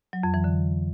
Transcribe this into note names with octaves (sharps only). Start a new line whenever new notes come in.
F#3
F2
E3
D3